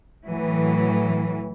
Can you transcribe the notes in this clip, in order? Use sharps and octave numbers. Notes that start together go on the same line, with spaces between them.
A2 E3 F#3